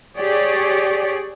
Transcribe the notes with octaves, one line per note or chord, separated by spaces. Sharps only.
G4 G#4 C#5 D5